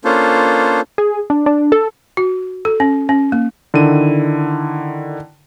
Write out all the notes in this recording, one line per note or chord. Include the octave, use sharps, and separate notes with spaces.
A#3 C#4 D4 F4 A4 C5
G#4
D4
D4
A4
F#4
A4
C#4
C#4
A#3
D3 D#3 E4 D#7